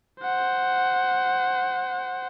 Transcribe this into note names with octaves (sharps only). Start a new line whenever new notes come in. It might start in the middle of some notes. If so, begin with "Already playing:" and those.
C5 F#5